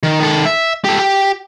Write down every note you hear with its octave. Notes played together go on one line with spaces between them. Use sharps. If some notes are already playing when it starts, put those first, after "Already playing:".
D#3
D#3 A4
E5
G4 A4
G4